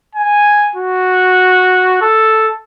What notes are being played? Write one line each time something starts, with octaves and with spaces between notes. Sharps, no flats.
G#5
F#4
A4